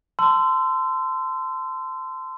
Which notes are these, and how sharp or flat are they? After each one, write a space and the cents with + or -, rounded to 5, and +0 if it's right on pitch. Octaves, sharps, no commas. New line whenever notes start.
A5 +15 C6 -20 E6 +20